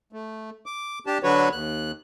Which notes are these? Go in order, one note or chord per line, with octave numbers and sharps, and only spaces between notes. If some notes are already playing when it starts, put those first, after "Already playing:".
A3
D6
D4 G4 A5
D3 F#3 D4 F#4 B4 C#5
D#2 F#6